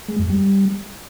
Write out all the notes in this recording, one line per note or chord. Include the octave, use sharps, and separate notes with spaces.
G#3
F#2
G3